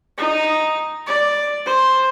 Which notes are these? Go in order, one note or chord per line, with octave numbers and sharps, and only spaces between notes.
D#4
D5
C5